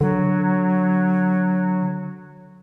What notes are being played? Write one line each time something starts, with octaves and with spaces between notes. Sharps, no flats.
D3 F#3